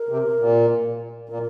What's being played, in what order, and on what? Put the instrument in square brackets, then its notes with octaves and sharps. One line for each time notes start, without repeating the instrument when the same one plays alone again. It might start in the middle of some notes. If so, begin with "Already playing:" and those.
Already playing: [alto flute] A#4
[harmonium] C3
A#2
[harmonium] A#2 [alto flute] A#4